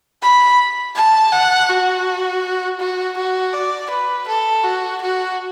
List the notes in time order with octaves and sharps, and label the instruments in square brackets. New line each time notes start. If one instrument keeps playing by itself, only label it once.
[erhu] B5
A5
F#5
F#4
F#4
F#4
D5
B4
A4
F#4
F#4